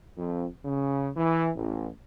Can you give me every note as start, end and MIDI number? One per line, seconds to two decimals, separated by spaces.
0.17 0.46 41
0.65 1.10 49
1.16 1.49 52
1.56 1.88 33